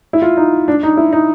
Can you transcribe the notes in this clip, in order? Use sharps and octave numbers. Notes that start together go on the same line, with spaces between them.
E4
F4
D#4
D4
D#4
E4
D#4